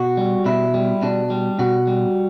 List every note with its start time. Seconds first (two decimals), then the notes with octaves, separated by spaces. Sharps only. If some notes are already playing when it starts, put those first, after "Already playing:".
Already playing: B2 F#4
0.17 G3
0.46 B2 E4
0.74 G3
1.02 B2 D4
1.30 G3
1.59 B2 F#4
1.87 G3